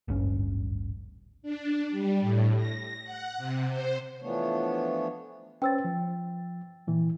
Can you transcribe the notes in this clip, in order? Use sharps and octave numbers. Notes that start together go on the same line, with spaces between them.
D1 G#1 G2 C#4
D4
G3
A2
A#6
F#5
C3
C5
E3 F3 A3 B3 D4 C#5
C#4 B4 C5 G5 E6 A6
F3
A#2 E3